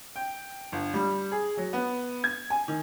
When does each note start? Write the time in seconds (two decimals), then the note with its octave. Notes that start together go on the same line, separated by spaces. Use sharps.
0.16 G5
0.72 G1
0.94 G3
1.32 G#4
1.57 F#3
1.73 B3
2.24 G#6
2.50 G#5
2.68 D#3